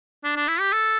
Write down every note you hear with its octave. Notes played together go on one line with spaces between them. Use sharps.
D4
D4
E4
G4
A4